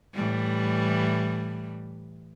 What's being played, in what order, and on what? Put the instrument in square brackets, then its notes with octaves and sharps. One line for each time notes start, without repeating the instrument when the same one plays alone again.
[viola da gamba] A2 E3 G3